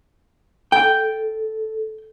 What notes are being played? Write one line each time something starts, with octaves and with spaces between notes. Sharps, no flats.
A4 G5